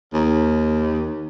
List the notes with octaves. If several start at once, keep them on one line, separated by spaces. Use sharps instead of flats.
D#2